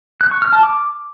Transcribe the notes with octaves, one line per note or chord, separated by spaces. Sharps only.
F#6
C#6
F6
A5
D6